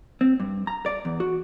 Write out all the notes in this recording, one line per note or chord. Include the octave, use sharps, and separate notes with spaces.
C4
G2
A#5
D5
E2
F#4